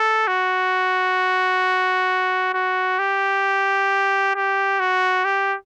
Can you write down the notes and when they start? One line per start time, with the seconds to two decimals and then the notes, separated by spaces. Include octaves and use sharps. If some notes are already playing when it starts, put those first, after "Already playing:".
Already playing: A4
0.28 F#4
2.54 F#4
2.99 G4
4.35 G4
4.80 F#4
5.25 G4